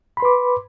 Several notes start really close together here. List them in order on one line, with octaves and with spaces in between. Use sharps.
B5 C6 B4 D6